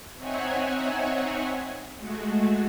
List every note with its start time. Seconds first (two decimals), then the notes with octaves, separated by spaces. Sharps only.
0.17 C4 D#4 C#5 E5 F#5 G#5
1.98 G#3 A3 F#4